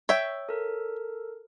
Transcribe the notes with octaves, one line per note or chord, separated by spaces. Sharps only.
C#5 E5 G5
A4 A#4